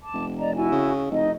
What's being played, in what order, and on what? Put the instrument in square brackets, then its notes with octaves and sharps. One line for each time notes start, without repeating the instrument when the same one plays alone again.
[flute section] A5 D6
[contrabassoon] F1
[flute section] D5 D#5 A#5
E4 F#4 G#5
[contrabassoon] C#3
[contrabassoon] F1 [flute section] D#4 D#5